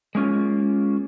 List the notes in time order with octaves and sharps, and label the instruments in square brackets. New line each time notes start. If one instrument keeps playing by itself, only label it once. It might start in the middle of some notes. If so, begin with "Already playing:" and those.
[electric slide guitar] G#3 A#3 C#4 F4